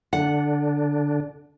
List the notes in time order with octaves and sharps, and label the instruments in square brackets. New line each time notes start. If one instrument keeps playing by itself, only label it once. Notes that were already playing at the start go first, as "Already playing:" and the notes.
[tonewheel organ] D3 D4 [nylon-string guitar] F#5